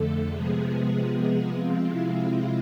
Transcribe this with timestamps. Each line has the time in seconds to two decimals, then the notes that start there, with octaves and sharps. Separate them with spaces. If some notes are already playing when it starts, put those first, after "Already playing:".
Already playing: F2 D3 A3 A4
0.29 C3 F3 G#3 B3 G#4
1.54 C3 F3 G#3 C4 F4
1.85 E4
2.16 E4